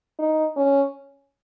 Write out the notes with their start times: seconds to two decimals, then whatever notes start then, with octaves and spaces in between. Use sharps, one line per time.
0.19 D#4
0.56 C#4